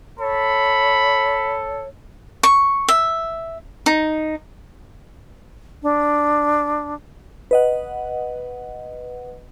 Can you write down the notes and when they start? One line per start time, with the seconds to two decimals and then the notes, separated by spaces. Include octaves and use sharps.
0.20 A4 C#5 B5
2.43 C#6
2.88 E5
3.86 D#4
5.83 D4
7.51 B4 D#5 F#5